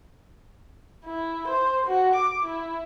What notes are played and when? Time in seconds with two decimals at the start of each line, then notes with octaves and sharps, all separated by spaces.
1.05 E4
1.48 C5
1.87 F#4
2.15 D6
2.45 E4